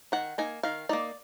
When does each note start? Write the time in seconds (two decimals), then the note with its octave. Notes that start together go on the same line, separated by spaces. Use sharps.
0.12 D#3 F#5
0.38 A#3 D#4 G#5
0.63 D#3 F5
0.89 A#3 D#4 D5